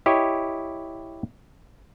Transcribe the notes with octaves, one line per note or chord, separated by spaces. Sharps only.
E4 G4 C#5 D#5